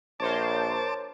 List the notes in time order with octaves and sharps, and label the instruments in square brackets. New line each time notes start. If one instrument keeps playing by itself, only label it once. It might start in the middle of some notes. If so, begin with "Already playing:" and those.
[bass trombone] A#1 [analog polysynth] A#4 C5 C#5 [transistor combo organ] A5 D6